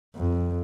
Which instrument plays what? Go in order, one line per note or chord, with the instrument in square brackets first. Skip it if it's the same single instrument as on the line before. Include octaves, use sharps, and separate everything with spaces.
[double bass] F2